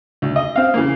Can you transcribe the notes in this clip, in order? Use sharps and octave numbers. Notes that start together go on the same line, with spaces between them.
D2
D#5
C4 F5
C#3 E3 A#3